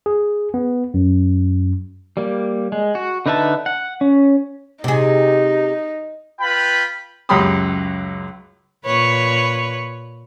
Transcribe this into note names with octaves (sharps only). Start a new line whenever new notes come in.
G#4
B3
F#2
G3 A#3
G#3
F#4
D3 D#4 B4 E5 A5
F#5
C#4
C3 D#4 G#4
F4 B4 G5 B5
C#2 F#2 G4 B5 C6 D#6
A#2 B4 C#5